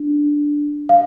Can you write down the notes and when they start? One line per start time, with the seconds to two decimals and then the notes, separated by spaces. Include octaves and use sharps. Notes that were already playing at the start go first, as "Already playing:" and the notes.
Already playing: D4
0.89 F5